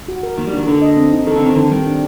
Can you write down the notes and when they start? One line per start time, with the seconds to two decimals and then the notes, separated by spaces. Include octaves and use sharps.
0.08 F#4
0.23 A#4
0.38 D#3 A#3
0.47 G3
0.53 D#3 D4
0.67 D3 A4
0.82 D#5
0.97 C4
1.12 D#4
1.27 D#3 A4
1.36 D3
1.41 D#3 C4
1.56 D3 D#3
1.71 D#3 G3
1.86 D4